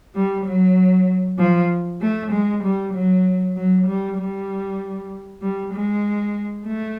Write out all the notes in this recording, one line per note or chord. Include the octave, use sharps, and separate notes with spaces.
G3
F#3
F3
A3
G#3
G3
F#3
F#3
G3
G3
G3
G#3
A3